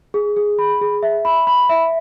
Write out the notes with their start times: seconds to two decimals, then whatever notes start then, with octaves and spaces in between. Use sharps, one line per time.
0.14 G#4
0.37 G#4
0.59 B5
0.81 G#4
1.03 E5
1.25 B5
1.47 B5
1.69 E5